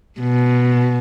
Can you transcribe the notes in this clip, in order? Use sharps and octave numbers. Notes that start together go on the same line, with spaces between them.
B2